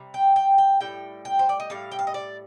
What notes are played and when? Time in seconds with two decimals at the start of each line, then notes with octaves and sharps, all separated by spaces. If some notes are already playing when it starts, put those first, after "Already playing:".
Already playing: C3 G3
0.14 G5
0.36 G5
0.58 G5
0.80 A2 G3 G5
1.25 G5
1.39 C5
1.49 D5
1.60 D#5
1.70 A2 G3 F5
1.91 G5
1.99 F5
2.07 D#5
2.14 D5